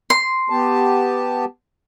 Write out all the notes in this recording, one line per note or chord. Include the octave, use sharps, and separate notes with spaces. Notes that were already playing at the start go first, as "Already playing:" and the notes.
C6
B3 G4 A5